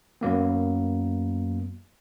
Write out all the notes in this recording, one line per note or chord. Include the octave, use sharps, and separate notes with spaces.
F#2 F#3 A#3 B3